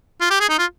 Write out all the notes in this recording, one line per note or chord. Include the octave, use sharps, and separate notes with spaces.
F4
G4
G#4
D#4
F4